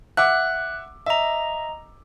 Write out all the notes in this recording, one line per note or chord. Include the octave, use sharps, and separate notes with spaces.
E5 F#5 D6 F#6
D#5 E5 A#5